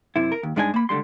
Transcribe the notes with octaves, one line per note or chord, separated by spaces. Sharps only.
F#2 C3 E4
A#4
D#2
G2 G#3 D4 D#4 G#4 G#5
A#3 B5
C#2 D3 G3 C6